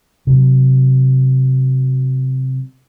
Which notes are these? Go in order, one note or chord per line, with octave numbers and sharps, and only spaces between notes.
C3 F#3